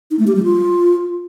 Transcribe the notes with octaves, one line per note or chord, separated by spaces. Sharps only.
D#4
A3
G4
G3
F4